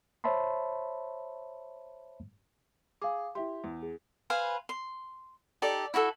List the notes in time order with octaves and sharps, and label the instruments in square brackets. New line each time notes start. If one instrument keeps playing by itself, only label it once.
[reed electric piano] C5 C#5 E5 A5 B5 C6
[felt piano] G#4 [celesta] F5 D6
[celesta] E4 E5 C6 [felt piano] G4
[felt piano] E2
[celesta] G#4
[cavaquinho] B4 C5 F5 G#5
C6
D#4 G4 A4 D5
E4 F#4 G4 A4